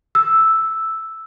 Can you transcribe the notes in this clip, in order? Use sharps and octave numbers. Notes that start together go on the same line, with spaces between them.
E6